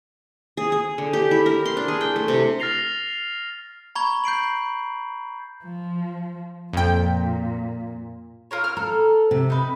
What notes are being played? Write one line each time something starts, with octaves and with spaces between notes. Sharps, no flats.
G#4
G#4
D3
G4
E4
A#4
C6
D4
G#4
G5
A3
C3
F6 A6 A#6 C7 F7 G7
A#5 B5 C#6 G#6 G7
G6 C7 D7 F#7
F3
F2 A#2 G5
F4 A#4 C#5
F6
A4 A#5
C3
D#4 B4